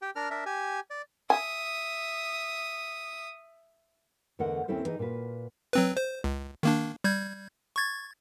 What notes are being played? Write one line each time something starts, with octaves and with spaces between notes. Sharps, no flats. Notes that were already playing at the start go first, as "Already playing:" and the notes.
G4 G5
D4 A#4 F6
D4 A#4 E5
G4 G#5
D5
E5 G#5 D#6
E2 D3 A3 A#4 D#5 F#5
D#2 C4 C#4 E4 A4 C5
E3 D#4 G#4 D#5
A#2 F4 F#4 B4
F#3 C4 B4
C5
C#2
D#3 A#3 D4
G3 G6 G#6
C#6 G#6 A6